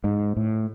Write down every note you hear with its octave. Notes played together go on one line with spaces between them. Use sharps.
G#2
A2